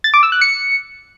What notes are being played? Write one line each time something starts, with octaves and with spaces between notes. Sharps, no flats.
A6
D6
E6
F#6
C#7